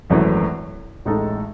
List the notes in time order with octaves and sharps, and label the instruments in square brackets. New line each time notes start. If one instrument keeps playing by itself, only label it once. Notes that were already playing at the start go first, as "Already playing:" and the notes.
[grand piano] G#1 F#2 E3 A3
A1 A2 G#3 D#4 A4